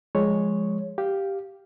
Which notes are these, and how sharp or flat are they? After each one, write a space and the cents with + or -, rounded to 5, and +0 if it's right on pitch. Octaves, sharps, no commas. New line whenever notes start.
F3 +0 G#3 -5 C#5 +0
G4 +0 F5 +0